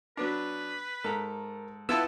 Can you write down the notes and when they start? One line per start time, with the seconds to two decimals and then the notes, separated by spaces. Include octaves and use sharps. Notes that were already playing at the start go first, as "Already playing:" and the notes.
0.17 F#3 B3 D4 B4
1.04 G#2 A4 A#4 A#5
1.89 B3 E4 F4 A4 A5 E6